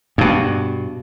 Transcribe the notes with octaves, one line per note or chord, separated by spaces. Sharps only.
G2 B2